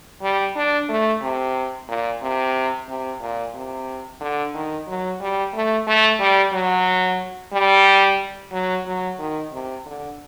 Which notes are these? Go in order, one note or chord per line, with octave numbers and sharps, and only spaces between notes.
G3
D4
A3
C3
A#2
C3
C3
A#2
C3
D3
D#3
F#3
G3
A3
A3
G3
F#3
G3
F#3
F#3
D#3
C3
D3